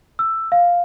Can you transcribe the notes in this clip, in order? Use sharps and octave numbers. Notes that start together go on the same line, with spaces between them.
E6
F5